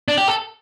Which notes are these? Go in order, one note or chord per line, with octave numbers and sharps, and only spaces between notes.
D4
G4
A4